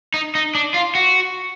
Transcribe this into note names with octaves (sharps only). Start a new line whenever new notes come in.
D#4
D#4
D4
F4
F#4